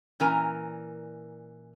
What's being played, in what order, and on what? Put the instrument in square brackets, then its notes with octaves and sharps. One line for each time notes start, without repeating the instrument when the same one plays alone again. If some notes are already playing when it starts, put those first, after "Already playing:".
[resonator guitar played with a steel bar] A#2 E3 C#4 A#4 G#5 A#5